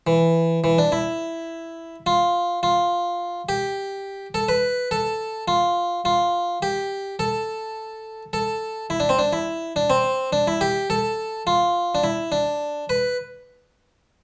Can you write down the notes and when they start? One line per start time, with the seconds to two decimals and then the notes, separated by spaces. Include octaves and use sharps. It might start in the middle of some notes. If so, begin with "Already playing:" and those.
0.07 E3
0.64 E3
0.78 D4
0.92 E4
2.06 F4
2.63 F4
3.49 G4
4.34 A4
4.48 B4
4.91 A4
5.48 F4
6.05 F4
6.62 G4
7.19 A4
8.33 A4
8.90 E4
9.00 D4
9.09 C4
9.19 D4
9.33 E4
9.76 D4
9.90 C4
10.33 D4
10.47 E4
10.61 G4
10.90 A4
11.47 F4
11.95 D4
12.04 E4
12.32 D4
12.89 B4